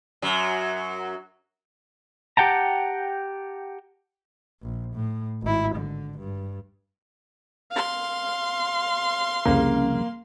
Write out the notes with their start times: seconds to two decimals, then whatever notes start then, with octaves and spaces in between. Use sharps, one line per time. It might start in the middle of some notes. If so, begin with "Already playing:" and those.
0.22 F#2 F#3
2.37 G4 F#5 G5 A5 A#5
4.62 A#1
4.94 A2
5.43 G#1 E4
5.75 D3
6.19 G2
7.72 F5 C6
9.45 C2 F2 C#3 A#3